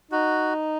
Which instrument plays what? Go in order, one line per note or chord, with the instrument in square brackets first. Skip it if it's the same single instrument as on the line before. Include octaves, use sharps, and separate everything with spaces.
[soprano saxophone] D#4 [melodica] F#4